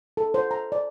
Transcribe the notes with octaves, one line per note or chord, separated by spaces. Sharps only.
A4
C5
A#5
D5